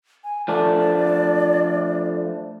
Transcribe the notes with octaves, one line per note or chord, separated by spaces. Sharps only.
G#5
F3 A3 D4 D5